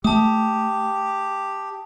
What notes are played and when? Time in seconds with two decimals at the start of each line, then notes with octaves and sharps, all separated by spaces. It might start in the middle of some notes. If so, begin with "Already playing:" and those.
0.04 A3 G4 A5 D#6